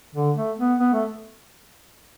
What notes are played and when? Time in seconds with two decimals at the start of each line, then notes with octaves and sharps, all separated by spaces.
0.15 D3
0.36 A3
0.58 B3
0.79 B3
0.93 A3